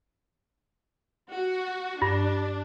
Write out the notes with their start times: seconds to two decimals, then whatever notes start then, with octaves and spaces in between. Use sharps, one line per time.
1.32 F#4
2.02 G2 D4